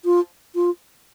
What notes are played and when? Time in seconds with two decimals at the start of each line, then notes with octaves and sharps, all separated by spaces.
0.05 F4
0.55 F4